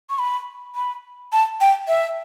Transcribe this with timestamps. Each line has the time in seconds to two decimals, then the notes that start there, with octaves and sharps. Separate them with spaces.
0.10 C#6
0.19 B5
0.75 B5
1.33 A5
1.61 G5
1.88 E5